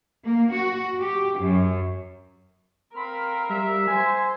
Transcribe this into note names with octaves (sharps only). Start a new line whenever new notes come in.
A#3
F#4
G4
F#2
C4 A#4 F5 B5
G3 E5
C5 G#5